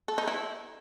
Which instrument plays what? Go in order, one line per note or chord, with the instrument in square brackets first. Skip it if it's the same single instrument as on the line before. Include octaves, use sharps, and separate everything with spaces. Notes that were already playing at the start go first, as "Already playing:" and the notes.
[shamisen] A4
D#4
E4